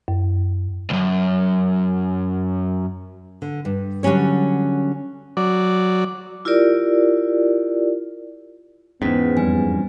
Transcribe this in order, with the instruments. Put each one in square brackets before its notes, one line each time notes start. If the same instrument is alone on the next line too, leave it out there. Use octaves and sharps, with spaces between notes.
[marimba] F#2
[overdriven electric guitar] C2 F#2
[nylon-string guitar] D3
G2
D3 F#3 G3 C#4 C#5
[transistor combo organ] F#3 D5
[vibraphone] E4 F4 G4 A#4 D5
[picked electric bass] E2 G#2 [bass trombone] B3 [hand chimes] C#4 C5 B6
[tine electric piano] F2 G3 C#4 [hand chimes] B4 G#5